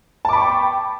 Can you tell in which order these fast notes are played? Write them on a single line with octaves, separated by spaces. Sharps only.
A5 D6 B5 C#6 G5